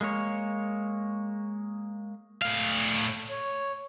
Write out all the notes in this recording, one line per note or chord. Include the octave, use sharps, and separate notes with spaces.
G#3 A#3 D#4 C#5
A2 F5
C#5